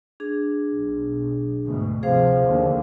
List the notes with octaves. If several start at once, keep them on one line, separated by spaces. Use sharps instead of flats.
D4 G#4
B1
D2 G#2 B2
C3 F3 G#4 C5 F5
D#2 D3